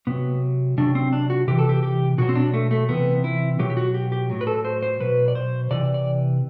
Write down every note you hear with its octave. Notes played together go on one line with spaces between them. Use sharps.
C3 F#3 B3
C3 F#3 D4
C4
D4
F#4
C3 E3 G4
A4
G4
G4
B2 F#3 F#4
C4
D4
A3
A3
C3 E3 B3
E4
B2 F#3 G4
G4
F#4
G4
G4
A2 F#3
B4
A4
C5
C5
B2 F#3 B4
D5
C5
C3 E3 D5
D5